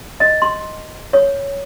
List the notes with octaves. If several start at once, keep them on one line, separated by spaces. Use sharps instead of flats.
D#5
C6
C#5